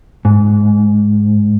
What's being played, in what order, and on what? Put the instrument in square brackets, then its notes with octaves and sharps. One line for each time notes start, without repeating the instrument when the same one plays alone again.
[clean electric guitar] G#2